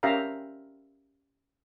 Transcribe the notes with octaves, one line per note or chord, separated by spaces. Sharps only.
C#4 G4 A#4 E5 F5 A#5